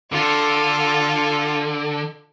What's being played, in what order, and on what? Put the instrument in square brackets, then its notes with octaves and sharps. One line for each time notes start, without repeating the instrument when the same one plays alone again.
[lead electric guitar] D3 [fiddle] F4 A4